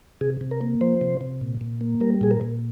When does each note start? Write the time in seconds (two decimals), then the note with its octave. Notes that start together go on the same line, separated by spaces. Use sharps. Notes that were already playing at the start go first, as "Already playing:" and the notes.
0.21 C3 G#4
0.41 C3
0.51 A#4
0.61 A#3
0.81 F3 C5
1.01 C3
1.21 C3
1.41 A#2
1.61 A#2
1.81 A#3
2.01 G3 A#4
2.21 A#2 G#4
2.31 A#4
2.41 A#2